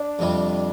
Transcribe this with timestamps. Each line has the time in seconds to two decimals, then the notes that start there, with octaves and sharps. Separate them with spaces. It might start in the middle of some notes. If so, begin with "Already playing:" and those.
Already playing: D4
0.19 F2 C3 G3